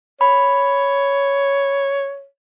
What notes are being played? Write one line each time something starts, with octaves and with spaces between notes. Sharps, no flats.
C#5 B5